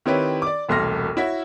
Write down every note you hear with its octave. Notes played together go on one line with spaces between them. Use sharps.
D#3 C4 E4 G4 B4 C#5
D5 D6
E1 C2 A3 C6 F6 A#6
E4 F#4 C#5 E5